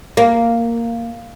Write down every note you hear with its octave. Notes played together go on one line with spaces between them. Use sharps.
A#3